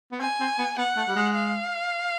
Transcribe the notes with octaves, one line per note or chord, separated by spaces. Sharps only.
B3
C4 G#5
C4
B3
B3 F#5
A3
G3
G#3
F5